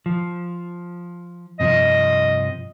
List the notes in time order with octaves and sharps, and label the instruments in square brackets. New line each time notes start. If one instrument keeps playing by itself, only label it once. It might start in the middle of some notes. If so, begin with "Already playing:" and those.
[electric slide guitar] F3
[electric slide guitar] G2 C3 F3 [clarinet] D#5